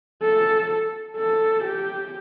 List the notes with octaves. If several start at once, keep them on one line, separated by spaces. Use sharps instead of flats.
A4
A4
G4